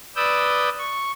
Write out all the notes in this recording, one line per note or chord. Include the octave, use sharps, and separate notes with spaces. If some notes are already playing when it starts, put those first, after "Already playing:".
B4 D5 D#6 E6 G6
C#6